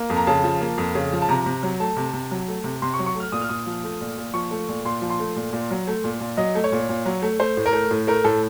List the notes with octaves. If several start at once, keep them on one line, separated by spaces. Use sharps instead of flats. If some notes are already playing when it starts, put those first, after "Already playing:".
Already playing: A#3
F2
A#5
C#3 A5
F3
A#3
F2
C#3
F3
A5
C3 A#5
C3
F#3
A3 A5
C3
C3
F#3
A3
C3
C3 C6
C#6
F#3
C#6
A3 F6
A#2 D#6
F6
A#2 D#6
F3
A3
A#2
A#2
F3 C#6
A3
A#2
A#2 C6
F3
C6
A3
A#2
A#2
F#3
A3
A#2
A#2
F#3 D#5
A3
C#5
A#2
A#2
F#3
A3
A3 C5
A2
A#4
A3
A2
A3 A#4
A2 A4